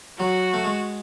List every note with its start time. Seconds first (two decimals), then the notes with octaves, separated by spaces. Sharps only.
0.19 F#3 F#4
0.54 A3
0.65 G#3